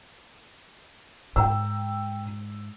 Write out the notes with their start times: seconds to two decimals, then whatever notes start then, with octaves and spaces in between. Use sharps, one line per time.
1.36 G#2 G5 A#5 E6